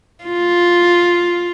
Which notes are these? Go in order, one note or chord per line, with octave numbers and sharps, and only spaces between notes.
F4